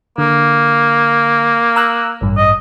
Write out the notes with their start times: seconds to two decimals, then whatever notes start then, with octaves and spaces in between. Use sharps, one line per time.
0.18 D3 A#3
1.76 A#5 E6 F#6
2.21 A1 G2
2.37 D#5